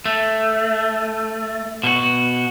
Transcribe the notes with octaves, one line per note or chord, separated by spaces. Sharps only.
A3
B2 F#4